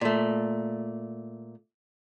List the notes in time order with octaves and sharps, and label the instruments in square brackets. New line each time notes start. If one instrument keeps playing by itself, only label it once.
[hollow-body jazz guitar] A#2 A3